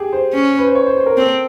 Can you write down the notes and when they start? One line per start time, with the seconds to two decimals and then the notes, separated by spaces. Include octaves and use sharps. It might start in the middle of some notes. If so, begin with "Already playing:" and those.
Already playing: G4 G#4
0.13 C5
0.33 C#4
0.58 B4
0.67 C5
0.75 C#5
0.86 C5
0.97 C5
1.06 A#4
1.17 C4 A4